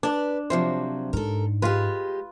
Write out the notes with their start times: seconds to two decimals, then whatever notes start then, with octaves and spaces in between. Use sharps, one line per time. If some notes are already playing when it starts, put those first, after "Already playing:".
0.03 D4 B4 D5
0.50 C3 F3 F#3 C5
1.13 G#2 A4 A#4
1.62 G#3 F4 G4 B4